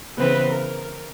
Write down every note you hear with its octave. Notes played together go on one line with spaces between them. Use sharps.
C#3 E3 B3 C4 B4
A#4